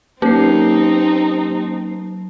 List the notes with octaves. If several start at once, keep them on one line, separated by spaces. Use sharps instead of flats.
F#3 A#3 C4 C#4 D#4 G4 C7